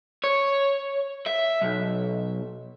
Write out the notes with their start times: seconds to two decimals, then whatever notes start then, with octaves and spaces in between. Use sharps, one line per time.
0.24 C#5
1.27 E5
1.62 B1